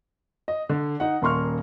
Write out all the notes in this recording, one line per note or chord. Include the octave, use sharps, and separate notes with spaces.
D#5
D3
D#4 F#5
D#1 A#3 C6 C#6 F6